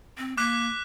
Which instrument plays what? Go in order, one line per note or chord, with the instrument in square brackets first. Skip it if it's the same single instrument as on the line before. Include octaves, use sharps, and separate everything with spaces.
[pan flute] C4
[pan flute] A#3 [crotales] D6 F#6 B6